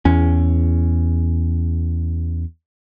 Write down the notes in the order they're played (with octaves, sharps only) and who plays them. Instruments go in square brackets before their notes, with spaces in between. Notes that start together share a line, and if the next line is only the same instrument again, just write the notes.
[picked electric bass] E2 C#4